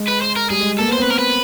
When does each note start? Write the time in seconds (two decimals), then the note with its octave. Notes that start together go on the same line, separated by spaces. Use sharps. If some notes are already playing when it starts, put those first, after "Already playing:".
Already playing: G#3
0.08 B4
0.22 C5
0.36 A#4
0.50 G3 G#4
0.60 G#3
0.79 A#3 A4
0.88 B3
0.93 C5
0.98 C4 B4
1.10 A#4
1.19 B4